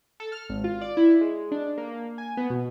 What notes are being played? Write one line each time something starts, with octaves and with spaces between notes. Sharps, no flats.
A4
F6
G#1
F4
D5
E4
G#3
D4
A#3
G#5
B3
B2